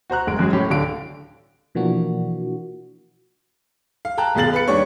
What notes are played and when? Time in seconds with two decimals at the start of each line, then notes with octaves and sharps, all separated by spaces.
0.10 F#4 C5 A#5 F#6
0.27 F#1 G#3 D7
0.39 F#2 F#3 G#3 G#4
0.53 A2 C#4 G4
0.70 D1 D3 F5 D7
1.75 B2 E3 F3 A#3 D4 F#4
4.05 F5
4.18 G5 A5 A#5 F#6
4.35 D#1 B2 G#4 F5 A6 F#7
4.53 B4 C#7
4.68 D#2 G3 D4 C#5 C#6